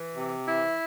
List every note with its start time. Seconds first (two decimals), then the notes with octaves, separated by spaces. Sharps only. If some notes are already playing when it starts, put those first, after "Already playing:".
Already playing: E3
0.14 C3
0.46 E3 E4